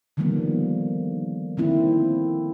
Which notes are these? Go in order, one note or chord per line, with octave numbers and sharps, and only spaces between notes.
D3 D#3 F3 G3 A#3 B3
D3 D#3 A#3 C4 E4